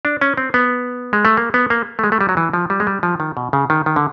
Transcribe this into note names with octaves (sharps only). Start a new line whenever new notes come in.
D4
C#4
C4
B3
G#3
A3
A#3
B3
A#3
A3
G#3
A3
G3
F#3
E3
F3
G3
G#3
G3
F3
D#3
B2
C#3
D#3
D#3
D3